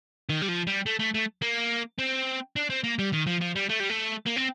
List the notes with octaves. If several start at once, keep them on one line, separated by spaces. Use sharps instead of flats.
D#3
G3
F3
G3
A3
A3
A3
A#3
C4
D4
C4
A#3
G3
D#3
F3
F3
G3
A3
G3
A3
A#3
C4